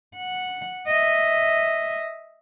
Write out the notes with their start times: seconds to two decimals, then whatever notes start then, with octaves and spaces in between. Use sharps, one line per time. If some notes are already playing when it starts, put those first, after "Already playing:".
0.17 F#5
0.87 D#5 E5